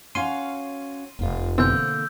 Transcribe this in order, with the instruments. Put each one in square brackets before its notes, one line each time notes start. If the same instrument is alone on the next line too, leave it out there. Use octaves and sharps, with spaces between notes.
[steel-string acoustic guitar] C#4 F#4 F5 [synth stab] C6 [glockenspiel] D#7
[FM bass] F1 [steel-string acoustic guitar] A#2 F4
[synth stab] B2 E3 C4 [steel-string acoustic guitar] D3 A#3 [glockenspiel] E6 G6